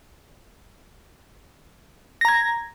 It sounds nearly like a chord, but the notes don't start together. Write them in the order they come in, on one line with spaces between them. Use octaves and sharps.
A#6 A#5 G#6